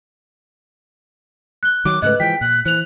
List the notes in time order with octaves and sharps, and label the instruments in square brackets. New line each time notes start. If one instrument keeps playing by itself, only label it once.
[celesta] F#6 G7
[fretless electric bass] D#3 F#3 [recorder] D6
[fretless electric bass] G#2 C#3 A3 [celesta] B4 D#5 [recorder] F#6
[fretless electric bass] E3 F3 G#3 [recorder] G5 [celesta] B6
[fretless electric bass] A#2 [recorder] F#6
[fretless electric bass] E3 [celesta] C5 F7 [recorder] F#6